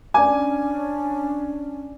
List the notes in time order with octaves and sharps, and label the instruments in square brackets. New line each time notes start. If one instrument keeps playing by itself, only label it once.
[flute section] C#4 D4 [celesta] D5 D6 [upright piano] G#5